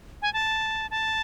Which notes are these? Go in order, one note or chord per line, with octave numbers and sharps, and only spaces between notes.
G#5
A5
A5